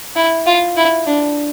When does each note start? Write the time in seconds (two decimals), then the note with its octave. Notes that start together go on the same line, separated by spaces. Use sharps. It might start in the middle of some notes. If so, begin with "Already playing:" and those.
0.16 E4
0.46 F4
0.77 E4
1.06 D4